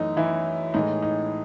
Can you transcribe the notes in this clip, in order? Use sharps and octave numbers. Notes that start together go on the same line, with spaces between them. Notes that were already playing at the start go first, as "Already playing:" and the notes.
Already playing: F#2 E3 A3 D#4
E3 E4
A2 E3 G#3 D#4
D#4